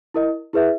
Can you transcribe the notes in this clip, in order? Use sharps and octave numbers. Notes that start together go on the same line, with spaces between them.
E4 A#4 D#5
E4 G#4 B4 E5